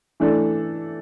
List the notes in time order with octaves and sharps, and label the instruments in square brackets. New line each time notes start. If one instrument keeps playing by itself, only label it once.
[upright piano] E3 A3 D4 A4